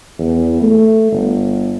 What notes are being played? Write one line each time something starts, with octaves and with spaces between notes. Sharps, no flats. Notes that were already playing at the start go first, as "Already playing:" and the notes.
E2
A3
G1